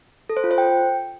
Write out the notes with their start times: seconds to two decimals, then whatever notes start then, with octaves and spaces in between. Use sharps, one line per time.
0.29 A4
0.37 C5
0.44 F4
0.51 C5
0.58 G5